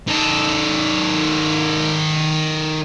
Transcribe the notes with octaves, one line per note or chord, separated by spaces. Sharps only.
D#3 A4